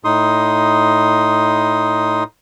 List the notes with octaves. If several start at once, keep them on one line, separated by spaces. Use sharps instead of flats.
A2 D#4 C6 D#6